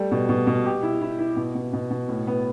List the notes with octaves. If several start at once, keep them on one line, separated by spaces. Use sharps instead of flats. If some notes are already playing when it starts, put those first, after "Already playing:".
Already playing: G3 A3
B2
B2
B2
G4
E4
E4
E4
B2
B2
B2
B2
A2
B3